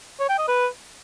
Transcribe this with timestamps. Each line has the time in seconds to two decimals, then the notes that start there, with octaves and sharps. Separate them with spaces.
0.20 C#5
0.29 G5
0.39 D#5
0.48 B4